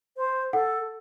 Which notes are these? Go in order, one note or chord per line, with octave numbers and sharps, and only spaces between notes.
C5
A4 F#5